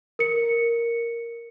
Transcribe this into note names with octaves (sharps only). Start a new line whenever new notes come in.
A#4 C#7